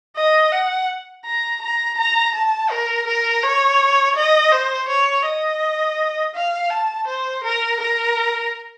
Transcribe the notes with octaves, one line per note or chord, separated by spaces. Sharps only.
D#5
F#5
A#5
A#5
A#5
A5
A#4
A#4
C#5
D#5
C5
C#5
D#5
F5
A5
C5
A#4
A#4